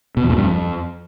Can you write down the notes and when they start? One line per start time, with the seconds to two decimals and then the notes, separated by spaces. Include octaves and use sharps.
0.17 B2
0.23 E2
0.30 A#2
0.37 G2
0.43 F2